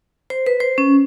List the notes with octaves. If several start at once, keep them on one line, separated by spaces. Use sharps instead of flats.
C5
B4
C5
C#4